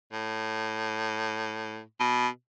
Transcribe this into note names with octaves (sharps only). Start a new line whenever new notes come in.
A2
B2